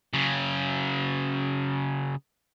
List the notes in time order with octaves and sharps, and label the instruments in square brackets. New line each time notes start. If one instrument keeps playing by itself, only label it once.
[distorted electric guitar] C#3 F#3